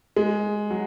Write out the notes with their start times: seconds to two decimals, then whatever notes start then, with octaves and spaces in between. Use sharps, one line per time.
0.16 G#3
0.70 F#3